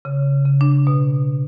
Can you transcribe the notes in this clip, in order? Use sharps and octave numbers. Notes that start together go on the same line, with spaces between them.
C#3
C#3
D4
B2